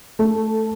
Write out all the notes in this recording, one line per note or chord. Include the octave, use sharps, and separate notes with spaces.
A3